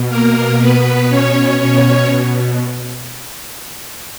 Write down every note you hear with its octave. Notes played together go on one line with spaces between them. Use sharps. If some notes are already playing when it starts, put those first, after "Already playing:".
Already playing: B2
A#3 A#4
B2 B3 B4
C#4 C#5
B2 C#4 C#5